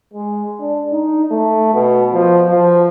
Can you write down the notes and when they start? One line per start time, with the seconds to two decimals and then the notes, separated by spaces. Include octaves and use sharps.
0.14 G#3
0.60 D4
0.92 D#4
1.31 A3
1.74 B2
2.13 F3
2.49 F3